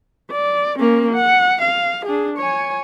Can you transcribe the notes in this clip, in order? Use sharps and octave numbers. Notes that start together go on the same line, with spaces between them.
D5
A#3 C#4
F#5
F5
D4 G#4
C#5 G#5